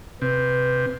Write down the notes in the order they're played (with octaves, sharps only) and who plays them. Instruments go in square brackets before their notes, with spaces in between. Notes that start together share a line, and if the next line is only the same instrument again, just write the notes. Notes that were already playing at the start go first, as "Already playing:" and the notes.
[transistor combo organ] C3 [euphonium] B4